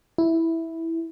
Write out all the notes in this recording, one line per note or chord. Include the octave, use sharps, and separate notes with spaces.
E4